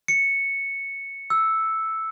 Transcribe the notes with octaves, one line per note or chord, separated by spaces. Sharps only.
C#7
E6